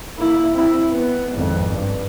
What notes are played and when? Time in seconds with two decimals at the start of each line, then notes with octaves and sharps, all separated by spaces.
0.18 A#3 E4
0.54 C4 E4
0.93 B3
1.31 G#1 F2
1.72 G2